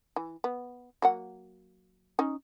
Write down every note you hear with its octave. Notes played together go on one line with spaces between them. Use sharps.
E3
B3
F#3 A#3 F#5
C#4 D#4